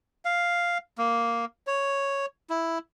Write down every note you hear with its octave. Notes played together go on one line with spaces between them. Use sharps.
F5
A#3
C#5
E4